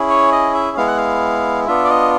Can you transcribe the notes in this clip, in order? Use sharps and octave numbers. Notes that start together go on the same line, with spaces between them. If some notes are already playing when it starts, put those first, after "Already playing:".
Already playing: C#4 E4 G#4
C#5
D#5
E5
G#3 B3 E4 F5
F#5
F5
B3 D4 F4 E5
D5
D#5